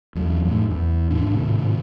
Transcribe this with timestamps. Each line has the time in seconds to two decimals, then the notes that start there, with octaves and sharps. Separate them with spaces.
0.15 E2 F#3
0.45 F2 A2
0.70 E2
1.10 D#2 G#2 D4
1.31 G#1 A2 C3